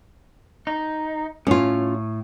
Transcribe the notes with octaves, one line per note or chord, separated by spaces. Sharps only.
D#4
A2 C#4 F4